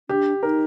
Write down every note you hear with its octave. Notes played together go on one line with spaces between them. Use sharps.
D4 G4
D#4 A#4